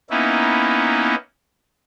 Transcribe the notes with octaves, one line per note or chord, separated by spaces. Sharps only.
A#3 B3 C#4 D#4 E4